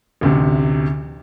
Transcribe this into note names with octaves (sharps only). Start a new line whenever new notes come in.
A1 D2 C3